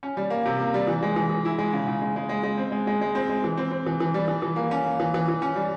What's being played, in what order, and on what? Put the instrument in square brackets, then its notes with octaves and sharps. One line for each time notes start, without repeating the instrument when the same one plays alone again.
[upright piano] C#4
G3
A#3
C3
A#3
G3
E3
G#3
E3
E3
E4
G#3
C#3
C#3
G#3
G#3
G#3
G#3
C4
G#3
G#3
G#3
C4
G#3
E3
C4
C4
E3
E3
G3
E3
E3
A#3
C#4
A#3
E3
E3
E3
C#4
G3